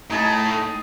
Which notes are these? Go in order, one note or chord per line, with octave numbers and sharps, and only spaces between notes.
A2 A3 D#4 G#4 A5